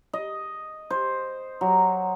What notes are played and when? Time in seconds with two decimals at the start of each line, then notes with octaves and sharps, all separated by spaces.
0.13 D#5
0.90 C5
1.61 F#3